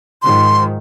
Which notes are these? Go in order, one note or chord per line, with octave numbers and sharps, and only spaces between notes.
G#2 D#3 F3 C6